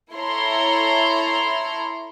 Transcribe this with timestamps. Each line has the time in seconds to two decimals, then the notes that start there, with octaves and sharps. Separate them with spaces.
0.14 E4 A4 C#5 A#5 C6